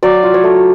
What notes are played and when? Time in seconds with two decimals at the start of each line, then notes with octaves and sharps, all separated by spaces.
0.03 F#3 D5
0.23 F4
0.34 C#5
0.44 A3